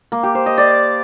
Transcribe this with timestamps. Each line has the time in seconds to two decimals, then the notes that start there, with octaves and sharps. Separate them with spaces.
0.12 A#3
0.23 G4
0.35 C5
0.46 D#5
0.58 D5